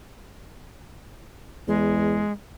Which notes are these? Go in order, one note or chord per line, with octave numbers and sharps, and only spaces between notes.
E2 G#3